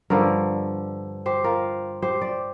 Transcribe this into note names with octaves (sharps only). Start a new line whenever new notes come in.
G2 D3 F3 A#4 D5
G4 C5
F4 A#4
G4 C5
D5